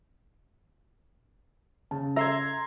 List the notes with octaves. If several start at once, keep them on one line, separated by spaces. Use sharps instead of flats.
C#3 A5
A4 E5 A#5 C6 E6 G#6